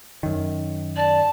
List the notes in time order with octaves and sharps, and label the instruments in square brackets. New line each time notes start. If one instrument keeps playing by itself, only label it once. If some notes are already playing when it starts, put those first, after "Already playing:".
[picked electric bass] F#2 D#3
[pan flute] D5 [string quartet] A5